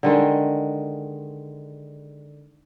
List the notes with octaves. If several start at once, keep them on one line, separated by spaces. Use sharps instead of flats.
D3 D#3 G#3